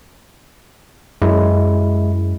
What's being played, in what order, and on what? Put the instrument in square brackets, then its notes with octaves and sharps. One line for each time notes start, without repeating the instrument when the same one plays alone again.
[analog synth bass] F#2 [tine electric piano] G#3 E4